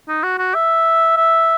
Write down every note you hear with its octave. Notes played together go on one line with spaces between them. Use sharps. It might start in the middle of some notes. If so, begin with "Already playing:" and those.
D#4
F#4
F#4
E5
E5